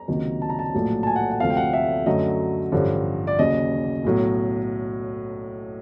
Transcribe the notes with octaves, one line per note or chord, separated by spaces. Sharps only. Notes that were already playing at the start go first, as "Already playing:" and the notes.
Already playing: A#5
C#2 C3 D#3 F#3 A#3
A5
A#5
A5
A#1 A2 F#3 A3
A5
G#5
F#5
F#5
D2 C3 F3 A3 F5
G5
F#5
E5
F#2 D3 F#3 A3 D#5
A1 G2 D3 F3
D5
D#2 C#3 F#3 D#5
B1 A2 F#3